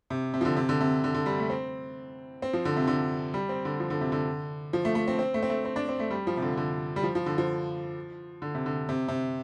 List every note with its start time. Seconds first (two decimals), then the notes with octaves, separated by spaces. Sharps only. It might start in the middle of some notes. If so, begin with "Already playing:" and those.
0.10 C3
0.34 C3
0.41 F3
0.45 D3
0.57 C3
0.69 D3
0.81 C3
1.04 D3
1.15 D3
1.26 G3
1.38 A3
1.50 C4
2.42 C4
2.53 F3
2.65 D3
2.77 C3
2.87 D3
3.34 G3
3.49 C4
3.65 D3
3.80 F3
3.90 D3
4.01 C3
4.12 D3
4.73 F3
4.85 A3
4.95 A3
5.08 C4
5.19 C4
5.34 A3
5.42 C4
5.50 A3
5.65 C4
5.76 D4
5.89 C4
6.00 A3
6.11 G3
6.27 F3
6.37 C3
6.42 D3
6.57 D3
6.96 G3
7.03 F3
7.15 F3
7.26 D3
7.38 F3
8.42 D3
8.55 C3
8.66 D3
8.89 C3
9.08 C3